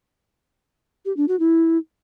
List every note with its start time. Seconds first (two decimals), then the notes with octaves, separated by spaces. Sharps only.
1.05 G4
1.17 D4
1.28 F#4
1.39 E4